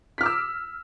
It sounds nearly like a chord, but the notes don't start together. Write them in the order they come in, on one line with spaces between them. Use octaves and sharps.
B6 F6 D6 E6